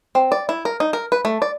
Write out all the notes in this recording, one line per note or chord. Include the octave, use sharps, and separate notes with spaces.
C4
D5
E4
A#4
D#4
A#4
B4
A3
D5